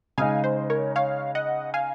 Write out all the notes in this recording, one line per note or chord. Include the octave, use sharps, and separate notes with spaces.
C#3 G#3 D#4 F5 G#5
C5
A#4 C#5
C#5 F5
D#5 F#5
F5 G#5